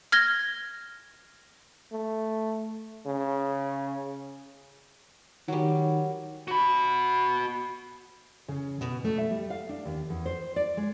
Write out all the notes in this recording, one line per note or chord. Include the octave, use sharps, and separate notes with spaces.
F6 G#6 A#6 G7
A3
C#3
D#3 F#3 G3
F#4 B5
C#3
B2
A3
E5
G3
F5
D4
D#2
E2
C5
D5
G#3